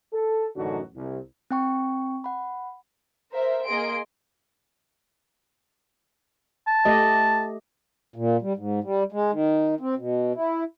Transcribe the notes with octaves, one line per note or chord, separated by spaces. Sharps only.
A4
A1 F#2 D3 D#4 F#4
C2
C4 G5 C#6
F#5 B5
A#4 C5 E5
A#3 G#4 D#5 C6 D7
A5
A3 G4 D#5
A#2
G3
G#2
G3
G#3
D#3
C4
B2
E4